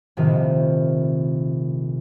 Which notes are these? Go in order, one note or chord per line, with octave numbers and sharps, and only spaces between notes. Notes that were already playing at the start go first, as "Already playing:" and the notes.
A#1 A2 C3 D#3 F3